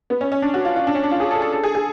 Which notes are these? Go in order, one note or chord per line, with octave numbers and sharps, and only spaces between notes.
B3
C#4
C#4
D4
F#4
F4
F4
D4
C#4
D4
F4
G#4
A4
A4
A4
G#4
G#4